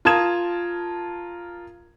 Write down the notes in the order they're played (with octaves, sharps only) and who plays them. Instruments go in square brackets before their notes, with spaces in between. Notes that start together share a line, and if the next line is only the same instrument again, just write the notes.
[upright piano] F4 A#4 A5 D#6 G#6 E7